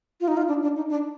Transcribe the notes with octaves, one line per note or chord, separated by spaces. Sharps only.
F4
D#4
F4
D4
D4
D#4
D4